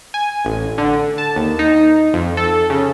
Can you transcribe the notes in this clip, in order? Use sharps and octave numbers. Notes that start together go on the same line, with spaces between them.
G#5
A1
D3
A5
D#2
D#4
F2
A4
C#3